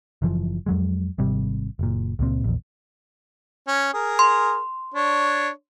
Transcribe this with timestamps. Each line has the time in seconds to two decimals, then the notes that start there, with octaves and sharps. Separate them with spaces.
0.22 F#1 F#2 E3 F3
0.66 F2 F#3 G#3
1.18 G#1 C3 G3
1.79 F#1 A#2
2.19 C#2 A#2 C4
2.44 A#1 E2
3.67 C#4
3.93 G#4 A#4
4.19 C6
4.94 D4 C#5